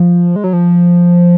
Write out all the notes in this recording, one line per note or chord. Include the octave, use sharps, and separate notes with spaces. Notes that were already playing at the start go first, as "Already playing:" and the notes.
Already playing: F3
G#3
F#3
F3